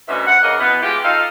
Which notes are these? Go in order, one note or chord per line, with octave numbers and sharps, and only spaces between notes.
D2 B2 C#4 E5
F#5
C#3 A#3 A#4 D#5
B2 E3 B3
G#3 F4 G4
D#4 F4 A4 D#5 F5